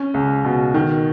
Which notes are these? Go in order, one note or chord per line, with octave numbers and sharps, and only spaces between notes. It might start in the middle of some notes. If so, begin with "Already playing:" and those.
Already playing: C#4
C#2
B2
D#3